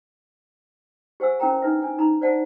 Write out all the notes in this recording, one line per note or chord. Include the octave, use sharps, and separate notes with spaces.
G4 C5 F#5 G#5 E6
C#4 E4 A#4 G5 A#5
D4 D#4 B4 E5
D4 G#5
D#4 A#5 B5
C5 D5 F#5 A5